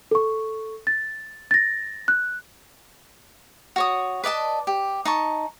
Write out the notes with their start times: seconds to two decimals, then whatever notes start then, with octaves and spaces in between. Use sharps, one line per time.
0.11 A4 C#6
0.87 A6
1.51 A6 A#6
2.08 F#6
3.76 F#4 C#5 D#6
4.24 B4 D5 D#5 A5
4.67 G4
5.05 D#4 A5 C#6